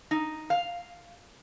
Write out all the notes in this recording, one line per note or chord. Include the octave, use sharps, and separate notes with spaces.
D#4
F5